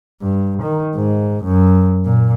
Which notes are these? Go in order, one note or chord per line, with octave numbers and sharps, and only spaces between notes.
G2
D#3
G#2
F#2
A#2